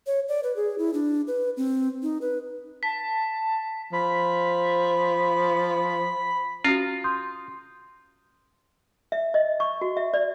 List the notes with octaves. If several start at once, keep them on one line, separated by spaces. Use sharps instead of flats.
C#5
D5
B4
G#4
E4
D4
B4
C4
D#4
B4
A5 B6
F3 B5
C#4 F4 F#4
C6 D#6 G6
E5
D#5
C#6
F#4
E5
D5